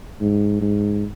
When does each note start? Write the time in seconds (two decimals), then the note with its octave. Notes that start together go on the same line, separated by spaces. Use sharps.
0.20 G#2
0.62 G#2